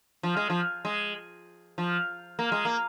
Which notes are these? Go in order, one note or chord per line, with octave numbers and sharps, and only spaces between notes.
F3
G#3
F3
G#3
F3
A#3
G#3
A#3